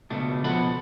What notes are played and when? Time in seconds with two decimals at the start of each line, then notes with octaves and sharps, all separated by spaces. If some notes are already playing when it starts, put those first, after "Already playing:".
0.10 C#2 B2 A3 D4
0.44 B2 F3 A4 F#5 B5